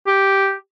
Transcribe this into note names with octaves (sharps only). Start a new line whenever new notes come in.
G4